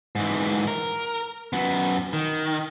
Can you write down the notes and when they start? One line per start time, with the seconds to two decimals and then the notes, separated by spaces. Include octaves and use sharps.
0.15 G#2 E3
0.68 A#4
1.53 F#2 B3
2.13 D#3